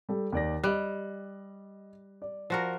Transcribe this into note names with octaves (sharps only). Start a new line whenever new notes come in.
G3 A4
D#2 D5 A#6
G3 D#5 F#6
D5
F3 F#4 A#4